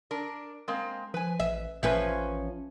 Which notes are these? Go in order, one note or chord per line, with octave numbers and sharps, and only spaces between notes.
D4 A#4
G#3 A#3 C4
F3 B4 G#5
A1 E5
A1 F3 C#4 B4 E5